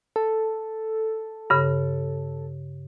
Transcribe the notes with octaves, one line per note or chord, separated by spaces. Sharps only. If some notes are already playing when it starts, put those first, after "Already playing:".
A4
G2 C#3